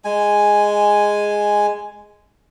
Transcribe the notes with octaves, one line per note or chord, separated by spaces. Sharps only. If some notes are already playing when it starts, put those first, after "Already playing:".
G#3 G#5